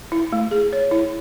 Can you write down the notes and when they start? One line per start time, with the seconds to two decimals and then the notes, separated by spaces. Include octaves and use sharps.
0.12 E4
0.33 A3
0.51 G#4
0.73 C#5
0.91 E4